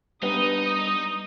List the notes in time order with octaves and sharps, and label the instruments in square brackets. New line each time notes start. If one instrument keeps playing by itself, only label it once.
[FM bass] G3 [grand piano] B3 D4 B4 [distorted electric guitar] D#4 [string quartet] D#6